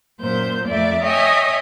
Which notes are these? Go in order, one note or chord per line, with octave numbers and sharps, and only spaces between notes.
F#2 A#2 C5 G6
F2 A3 D5 E5
C#5 D#5 E5 G5 G#5